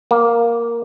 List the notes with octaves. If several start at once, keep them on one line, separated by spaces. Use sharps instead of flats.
A#3